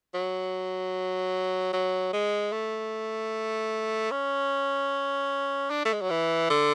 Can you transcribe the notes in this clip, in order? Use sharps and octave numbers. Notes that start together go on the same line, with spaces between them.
F#3
F#3
G#3
A3
C#4
D4
A3
G#3
F#3
E3
D3